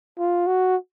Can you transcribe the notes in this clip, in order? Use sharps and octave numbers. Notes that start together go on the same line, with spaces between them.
F4
F#4